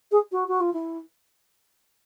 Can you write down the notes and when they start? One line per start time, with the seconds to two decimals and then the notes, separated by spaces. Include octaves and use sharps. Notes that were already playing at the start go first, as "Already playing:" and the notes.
0.12 G#4
0.32 F#4
0.48 F#4
0.60 F4
0.73 E4